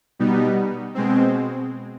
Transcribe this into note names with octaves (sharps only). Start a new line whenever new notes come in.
B2 G3 B3 D#4
B2 G#3 C4